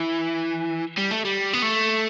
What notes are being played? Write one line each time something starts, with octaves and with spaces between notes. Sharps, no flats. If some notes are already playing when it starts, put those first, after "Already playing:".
Already playing: E3
G3
A3
G3
B3
A3